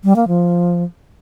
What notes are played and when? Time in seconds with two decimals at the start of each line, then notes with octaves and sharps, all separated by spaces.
0.04 G3
0.16 A#3
0.28 F3